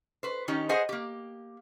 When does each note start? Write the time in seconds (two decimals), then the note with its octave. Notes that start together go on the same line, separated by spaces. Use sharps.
0.23 B4 C5
0.48 D#3 C#4 D#4 G4
0.69 G#4 B4 C5 D#5 F#5 G#5
0.89 A#3 G4